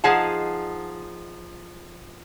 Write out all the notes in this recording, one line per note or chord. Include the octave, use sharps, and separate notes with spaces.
F3 D#4 G#4 F#5 A5